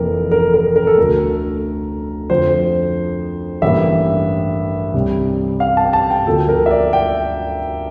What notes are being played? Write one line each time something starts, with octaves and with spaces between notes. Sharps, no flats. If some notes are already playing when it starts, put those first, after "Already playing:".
Already playing: F1 F2 E3 A#3 A#4
A#4
A#4
A#4
A4
D2 D3 A3 A#4
F2 D3 F3 C5
A1 G2 E3 A#3 E5
C2 C3 G3
F5
A5
G5
A5
G5
D2 D3 F3 A#3 A4
A#4
E5
D5
G5